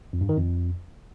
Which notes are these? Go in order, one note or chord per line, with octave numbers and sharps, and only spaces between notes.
F2
G2
D#3
F2